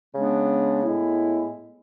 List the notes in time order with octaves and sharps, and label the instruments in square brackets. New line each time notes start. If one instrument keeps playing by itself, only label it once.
[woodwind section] C#3 G#3 B3 D4
A2 G#3 B3 E4